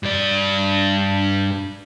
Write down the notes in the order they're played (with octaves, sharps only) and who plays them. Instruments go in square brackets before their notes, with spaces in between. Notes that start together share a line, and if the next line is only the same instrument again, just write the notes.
[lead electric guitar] G2 D5